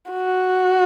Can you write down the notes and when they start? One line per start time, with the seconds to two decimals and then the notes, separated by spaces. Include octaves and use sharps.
0.11 F#4